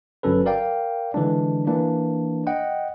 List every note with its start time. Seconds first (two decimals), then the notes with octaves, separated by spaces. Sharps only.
0.23 G1 F#3 C#4 A4 B4
0.46 A#4 D5 F5 G5
1.14 D3 E3 G#3 D4
1.67 E3 A#3 D4
2.47 D#5 F#5 G5